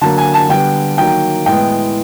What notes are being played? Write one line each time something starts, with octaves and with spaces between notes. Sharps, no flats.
D3 F#3 A#3 A5
G#5
A5
D3 G3 B3 G5
D#3 F#3 A#3 G5
A2 E3 G#3 B3 G5